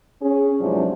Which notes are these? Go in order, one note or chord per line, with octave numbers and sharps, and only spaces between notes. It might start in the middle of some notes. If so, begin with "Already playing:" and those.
C#4 G#4
E2 G#2 C3 F3 F#3 D4